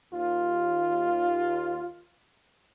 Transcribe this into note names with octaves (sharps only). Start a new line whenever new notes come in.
D#2 F4